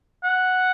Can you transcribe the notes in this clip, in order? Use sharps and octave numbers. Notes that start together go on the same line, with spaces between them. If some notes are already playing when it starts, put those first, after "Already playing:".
F#5